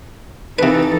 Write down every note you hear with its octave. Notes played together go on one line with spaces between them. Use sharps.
C3 E3 D#4 A4 B4